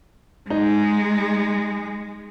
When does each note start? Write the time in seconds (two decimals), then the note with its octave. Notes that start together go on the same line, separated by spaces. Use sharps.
0.50 G#3 D#4